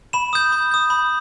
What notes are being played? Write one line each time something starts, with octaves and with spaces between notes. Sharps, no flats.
B5 E7
D#6 G6
B5
D#6 G6
B5